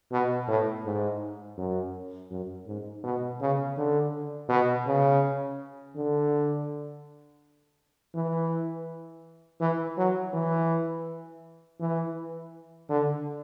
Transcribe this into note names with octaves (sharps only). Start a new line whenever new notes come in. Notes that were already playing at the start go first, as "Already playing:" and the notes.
B2
A2
G#2
F#2
F#2
G#2
B2
C#3
D3
B2
C#3
D3
E3
E3
F#3
E3
E3
D3